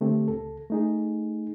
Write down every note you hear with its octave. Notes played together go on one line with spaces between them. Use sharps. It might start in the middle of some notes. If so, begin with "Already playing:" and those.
D3 A3 C4 G4
C#2 A4
A3 D#4 G#4